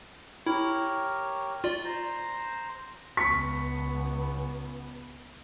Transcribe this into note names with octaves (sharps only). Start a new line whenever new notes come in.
E4 G4 A#4 C#5
F4 D5
C5 A#5
C#2 B3 C#6 B6